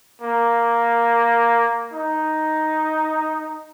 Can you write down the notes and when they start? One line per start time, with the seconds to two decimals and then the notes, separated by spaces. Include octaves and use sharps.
0.22 A#3
1.93 D#4